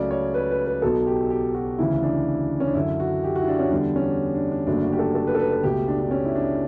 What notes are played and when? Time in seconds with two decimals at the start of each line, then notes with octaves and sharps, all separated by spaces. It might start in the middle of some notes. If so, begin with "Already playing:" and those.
Already playing: C#2 C#3 F#3 A3 D5
0.11 C#5
0.34 B4
0.51 B4
0.66 B4
0.82 B1 B2 F#3 A4
1.07 G4
1.30 G4
1.54 F#4
1.78 D2 C#3 E3 E4
2.03 D4
2.60 C#4
2.67 D4
2.74 F#2 D3 F#3 E4
3.00 F#4
3.24 G4
3.36 F#4
3.41 E4
3.48 D4
3.59 C#4
3.71 E2 D3 G3 D4
3.96 C#4
4.35 D4
4.51 D4
4.67 F#1 F#2 D3 F#3 A3 D4
4.84 F#4
4.92 G4
4.99 A4
5.15 A4
5.27 B4
5.35 A4
5.39 B4
5.52 B4
5.63 C#2 B2 A3 G4
5.88 D4
5.99 D4
6.11 C#4
6.25 E4
6.35 D4